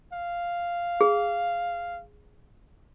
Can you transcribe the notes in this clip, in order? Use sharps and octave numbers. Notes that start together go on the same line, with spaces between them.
F5
G#4